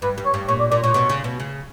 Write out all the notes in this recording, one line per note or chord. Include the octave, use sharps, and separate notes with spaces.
G2 B4
G2
C#5
G2
A#2 C#5
D5
A#2 D5
A#2 C#5
B2
C#3
B2
C#3